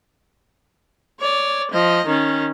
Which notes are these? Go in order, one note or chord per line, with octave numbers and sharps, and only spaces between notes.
C#5 D5
F3 D#5
D#3 C#4